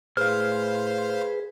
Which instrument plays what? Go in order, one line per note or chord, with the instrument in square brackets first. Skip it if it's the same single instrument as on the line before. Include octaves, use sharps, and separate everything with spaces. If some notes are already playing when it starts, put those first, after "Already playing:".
[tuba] A2 [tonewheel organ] G#4 B4 [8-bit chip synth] C5 F5 [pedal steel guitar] F6